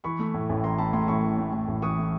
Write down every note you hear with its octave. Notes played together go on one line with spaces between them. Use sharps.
E3 B5 C#6
A3
A2
A1
E3 A#5 C6
A3 A5 B5
A2 A#5 C6
A1 B5 C#6
E3
A3
A2
A1
E3 C#6 D#6
A3